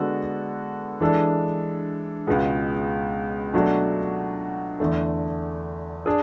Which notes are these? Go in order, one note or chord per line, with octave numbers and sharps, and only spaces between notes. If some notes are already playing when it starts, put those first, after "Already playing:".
Already playing: D3 G#3 B3 F#4 A4
E3 G#3 D4 A4
C#2 B2 G#3 B3
B2 F#3 A3 D4 F#4
E2 D3 A3
D4 G#4